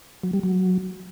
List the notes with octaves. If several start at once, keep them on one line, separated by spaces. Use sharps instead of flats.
F#3
G3
F#3